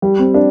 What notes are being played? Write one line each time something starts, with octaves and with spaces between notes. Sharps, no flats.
G3
C4
D4